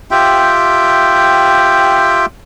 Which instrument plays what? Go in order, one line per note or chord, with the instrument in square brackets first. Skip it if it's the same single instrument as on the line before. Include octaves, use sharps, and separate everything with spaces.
[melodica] F4 G4 E5 G5